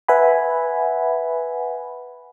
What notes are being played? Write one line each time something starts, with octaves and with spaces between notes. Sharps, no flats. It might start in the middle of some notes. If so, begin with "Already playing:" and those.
B4 E5 F#5 G#5 B5